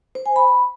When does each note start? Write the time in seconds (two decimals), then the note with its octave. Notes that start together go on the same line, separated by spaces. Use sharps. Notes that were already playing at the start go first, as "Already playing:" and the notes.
0.15 C5
0.26 G#5
0.36 B5